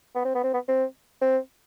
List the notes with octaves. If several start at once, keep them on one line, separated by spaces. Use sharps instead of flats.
B3
C4
B3
C4
B3
C4
C4